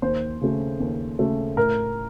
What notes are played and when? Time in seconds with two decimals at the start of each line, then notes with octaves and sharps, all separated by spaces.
0.02 D#2 C5
0.41 C#3 A3
0.80 D#2
1.18 C#3 A3
1.57 A2 A#4